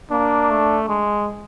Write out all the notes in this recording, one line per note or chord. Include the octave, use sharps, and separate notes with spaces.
A#3 D4
A3
G#3